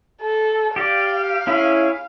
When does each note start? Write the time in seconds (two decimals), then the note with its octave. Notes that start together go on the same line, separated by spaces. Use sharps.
0.21 A4
0.76 G4 D5 F5
1.47 C#4 E4 G#4